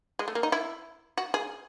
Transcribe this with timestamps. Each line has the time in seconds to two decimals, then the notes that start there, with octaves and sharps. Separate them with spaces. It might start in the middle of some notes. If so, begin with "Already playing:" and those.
0.19 G#3
0.28 A3
0.35 A#3
0.43 D#4
0.52 E4
1.17 F#4
1.34 G#4